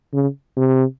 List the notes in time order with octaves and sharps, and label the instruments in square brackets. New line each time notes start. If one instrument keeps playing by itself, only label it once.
[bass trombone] C#3
C3